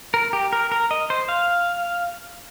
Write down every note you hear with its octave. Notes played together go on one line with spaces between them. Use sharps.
A#4
G4
A#4
A#4
D#5
C5
F5